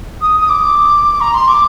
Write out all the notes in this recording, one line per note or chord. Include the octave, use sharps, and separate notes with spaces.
D#6
D#6
D6
A#5
C6
D6